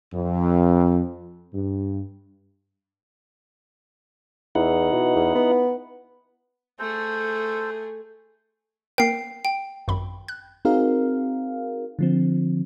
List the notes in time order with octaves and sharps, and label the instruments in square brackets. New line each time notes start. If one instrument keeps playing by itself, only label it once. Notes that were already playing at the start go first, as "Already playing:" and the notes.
[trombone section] F2
G2
[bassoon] E2 [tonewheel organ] D#4 E4 F#5
[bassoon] B2
E2
B3
[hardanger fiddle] A3 G#4 [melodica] A4 C5
[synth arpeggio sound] A#3 A#4 [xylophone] G5 C7
[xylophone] G5
[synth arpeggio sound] G#1 F#2 B5
F#6
[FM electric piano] C4 D#4 F#4 G#4 A#4 F5
D3 F3 C4